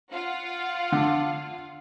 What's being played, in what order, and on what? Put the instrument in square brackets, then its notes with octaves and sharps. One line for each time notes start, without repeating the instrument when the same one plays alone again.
[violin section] F4 F5 F#5
[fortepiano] D3